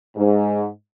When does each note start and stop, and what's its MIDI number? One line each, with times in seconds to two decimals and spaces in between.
0.17 0.67 44